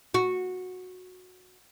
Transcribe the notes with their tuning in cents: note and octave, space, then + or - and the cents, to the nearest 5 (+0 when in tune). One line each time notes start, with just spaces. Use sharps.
F#4 -15